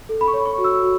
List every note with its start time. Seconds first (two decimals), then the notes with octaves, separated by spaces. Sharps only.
0.09 A4
0.21 B5
0.28 C#6
0.33 C#5
0.46 C#6
0.58 F#4
0.64 E6
0.82 F#4